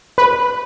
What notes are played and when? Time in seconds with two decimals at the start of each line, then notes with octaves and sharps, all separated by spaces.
0.18 B4